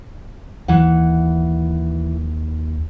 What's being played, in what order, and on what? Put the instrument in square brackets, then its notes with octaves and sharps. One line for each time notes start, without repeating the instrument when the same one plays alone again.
[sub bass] D#2 [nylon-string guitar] E3 F#5